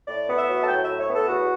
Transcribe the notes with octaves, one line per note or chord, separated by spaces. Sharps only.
A2 D5
B3
E5
F#3
A5
A2 G5
A2 E5
C#5
B3
A4
E2 F#4